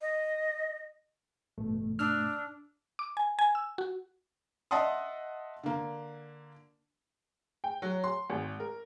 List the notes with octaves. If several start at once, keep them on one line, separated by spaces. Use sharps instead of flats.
D#5
A1 G2 B2 A3
D4 E6 F6
D6
G#5
G#5
E6
F#4
D#5 E5 F#5 A5 C6 D#6
D3 A#3
G5
F#3
C6
G#1
A#4